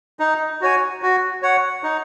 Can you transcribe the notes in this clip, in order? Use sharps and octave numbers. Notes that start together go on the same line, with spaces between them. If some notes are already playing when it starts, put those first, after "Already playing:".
D#4
F#4 C#5 G#5
F#4
C#5 F#5
D#4